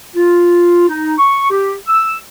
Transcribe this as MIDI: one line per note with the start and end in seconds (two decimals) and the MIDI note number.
0.15 0.87 65
0.88 1.14 63
1.18 1.49 85
1.51 1.74 67
1.88 2.16 88